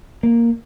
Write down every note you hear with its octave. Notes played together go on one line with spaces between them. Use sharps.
A#3